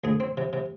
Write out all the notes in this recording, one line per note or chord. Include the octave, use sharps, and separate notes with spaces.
D2 G#4
C4
C3
C3